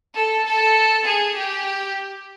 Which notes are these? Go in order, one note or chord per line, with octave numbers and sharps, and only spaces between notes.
A4
A4
G#4
G4